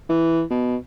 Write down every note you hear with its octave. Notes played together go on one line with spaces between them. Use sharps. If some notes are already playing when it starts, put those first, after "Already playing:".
E3
B2